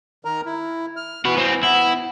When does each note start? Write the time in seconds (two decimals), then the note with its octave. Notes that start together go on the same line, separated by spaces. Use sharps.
0.25 D#3 A#4 A#5
0.45 E4
0.96 F6
1.25 E3 F#4 B4
1.37 B3 C4
1.63 B3 E4 B5